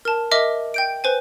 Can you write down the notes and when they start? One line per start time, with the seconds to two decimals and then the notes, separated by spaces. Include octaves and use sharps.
0.05 A#4 A5
0.31 A#4 D#5 E5 D6
0.74 G5 G6 D7
1.04 B4 C5 G#5